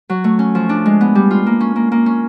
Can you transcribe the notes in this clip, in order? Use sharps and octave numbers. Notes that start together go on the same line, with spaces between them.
F#3
A3
C#4
F3
D4
G#3
B3
G3
F4
A#3
C#4
A#3
A#3
C#4